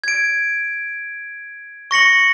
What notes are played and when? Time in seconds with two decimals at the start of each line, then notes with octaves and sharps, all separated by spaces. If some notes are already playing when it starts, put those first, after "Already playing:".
0.04 G#6 D7
1.91 C#6 A#6 C#7 F#7